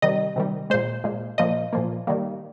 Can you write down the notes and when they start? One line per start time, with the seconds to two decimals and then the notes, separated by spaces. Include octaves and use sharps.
0.02 C3 D#3 G3 D#5
0.36 C3 D#3 G3
0.70 A#2 G#3 C5
1.04 A#2 G#3
1.38 A#2 F3 A#3 D#5
1.73 A#2 F3 A#3
2.07 D#3 G3 A#3